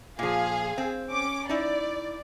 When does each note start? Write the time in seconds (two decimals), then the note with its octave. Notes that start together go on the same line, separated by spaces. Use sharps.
0.19 A#2 F3 G#4 F5
0.78 C4
1.10 C#4 D6
1.49 D#4 E4 D5